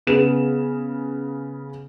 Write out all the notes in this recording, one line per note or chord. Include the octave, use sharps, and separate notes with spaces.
C#3 B3 E7